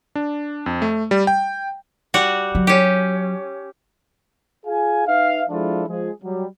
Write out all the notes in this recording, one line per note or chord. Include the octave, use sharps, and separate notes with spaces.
D4
F2
A3
G3
G5
G3 F#4
F#3
C#4 G4
F4 G#4 F5 G#5
D#4 B4 E5 F5
F3 G#3 D4 E4 F4 A4
F3 G#3 G#4
F#3 G3